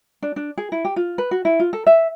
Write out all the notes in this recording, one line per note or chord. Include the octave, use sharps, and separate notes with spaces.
D4
D4
G#4
E4
G4
F4
B4
F#4
E4
F4
A4
E5